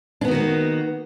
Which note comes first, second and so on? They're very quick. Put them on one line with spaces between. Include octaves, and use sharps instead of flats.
D4 B3 D#3 F#4 A#3